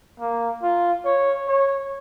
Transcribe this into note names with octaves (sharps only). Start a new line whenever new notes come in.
A#3
F4
C#5
C#5